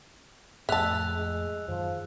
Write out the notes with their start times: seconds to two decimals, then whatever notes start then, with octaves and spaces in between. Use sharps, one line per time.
0.69 F2 A2 E5 A5 E6 F#6 F7
1.15 G#3
1.68 F#2 D#3 F3